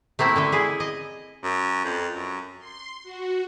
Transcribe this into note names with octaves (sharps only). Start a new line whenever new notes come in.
A3 A#3 C4 E4
D3 A4 E5
E4 G#4 D5
D#5
F#2
F2
F#2
C6
F#4